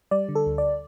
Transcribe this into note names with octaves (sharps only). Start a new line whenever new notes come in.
G3 D5
D3
A4
D2
D5